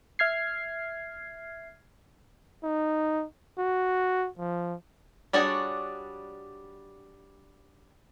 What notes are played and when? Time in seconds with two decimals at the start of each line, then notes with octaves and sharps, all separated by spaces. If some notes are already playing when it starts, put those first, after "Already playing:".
0.19 E5 F6 G#6 C7
2.64 D#4
3.58 F#4
4.38 F3
5.33 G3 D4 F#4 G#4 C#5